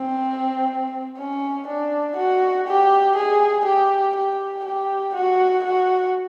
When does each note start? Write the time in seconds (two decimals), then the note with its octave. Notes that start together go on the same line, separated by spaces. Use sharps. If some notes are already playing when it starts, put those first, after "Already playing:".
Already playing: C4
1.18 C#4
1.68 D4
2.16 F#4
2.67 G4
3.16 G#4
3.65 G4
4.15 G4
4.65 G4
5.14 F#4
5.64 F#4